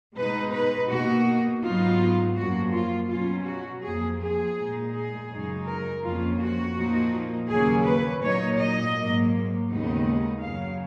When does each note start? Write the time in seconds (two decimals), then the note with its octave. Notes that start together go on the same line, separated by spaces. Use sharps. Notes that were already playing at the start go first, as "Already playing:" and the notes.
0.16 B2 G#3 D#4 B4
0.53 B4
0.89 B2 A#3 D#4 F#4
1.62 G#2 F#3 B3 D#4 F4
2.36 F#2 F3 A#3 F#4
2.72 F4
3.09 B2 F#3 C#4 F4
3.46 F#4
3.82 F2 F3 A#3 G#4
4.19 G#4
4.56 A#2 G#3 D#4
4.92 G#4
5.30 F#2 C#3 G#3 D#4
5.66 A#4
6.02 F2 F3 A#3 C#4 F4
6.39 F#4
6.76 A#2 F3 A#3 D#4
7.49 D#2 C#3 F#3 A#3 C#4 G#4
7.86 B4
8.22 A#2 F#3 A#3 D#4 C#5
8.59 D#5
8.96 G#2 F#3 A#3
9.69 D#2 C#3 G#3 B3 D#4
10.42 F#2 C#3 F#3 F5